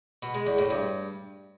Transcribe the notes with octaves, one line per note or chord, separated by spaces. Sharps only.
B2
G#3
E2
A2
G2